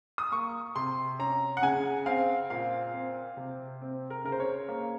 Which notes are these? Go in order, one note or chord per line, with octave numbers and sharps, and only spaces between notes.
D#6
A#3 C#6
C3 C6
C#4 A#5
F#5
C#3 G#5
C4 F5
A#2 F5
C4
C3
C4
A#4
C#3 A#4
C5
C#5
A#3